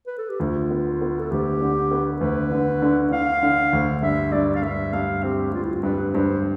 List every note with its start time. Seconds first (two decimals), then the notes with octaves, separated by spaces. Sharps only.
0.07 B4
0.18 A4
0.29 G4
0.40 D2 F4
0.71 B3
1.01 B3
1.19 A4
1.31 D2 G4
1.61 D3
1.91 B3
2.21 D2 B4
2.51 D3
2.82 D3
3.12 D3 F5
3.43 D3
3.73 D2
4.02 G2 E5
4.32 G2 D5
4.55 F5
4.63 G2 E5
4.93 G2 F5
5.23 C4 G4
5.53 G2 F4
5.63 E4
5.72 F4
5.83 G2 B4
6.14 G2 C5